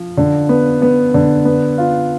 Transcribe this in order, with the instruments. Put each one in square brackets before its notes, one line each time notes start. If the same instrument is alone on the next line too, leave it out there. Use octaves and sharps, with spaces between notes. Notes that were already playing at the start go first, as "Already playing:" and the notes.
Already playing: [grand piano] F3
D3
B3
B3
D3
B3
F4